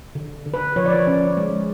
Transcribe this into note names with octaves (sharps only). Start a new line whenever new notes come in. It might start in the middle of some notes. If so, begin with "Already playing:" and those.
D3
D3
B4
F3 C#5
D5
C#5
C#4
G#3